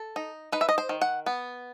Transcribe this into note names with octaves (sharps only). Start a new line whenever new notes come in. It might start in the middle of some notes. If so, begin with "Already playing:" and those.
Already playing: A4
D#4
D#4 B4
E5
D#5
C5
D#3
F#5
B3